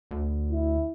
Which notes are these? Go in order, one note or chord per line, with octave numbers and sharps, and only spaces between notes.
D2
E4